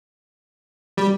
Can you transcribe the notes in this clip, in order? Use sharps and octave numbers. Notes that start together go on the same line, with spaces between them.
G3